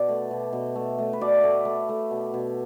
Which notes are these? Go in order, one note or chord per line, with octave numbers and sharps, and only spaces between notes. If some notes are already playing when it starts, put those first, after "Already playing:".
Already playing: B2 D5
A3
B2
B2
A3
A3
B4
B2 D5
A3
A3
A3
B2
B2